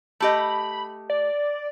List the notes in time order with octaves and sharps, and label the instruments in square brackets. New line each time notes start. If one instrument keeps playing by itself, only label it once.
[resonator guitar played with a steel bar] A3 G4 D#5 [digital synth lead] B5
[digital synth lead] D5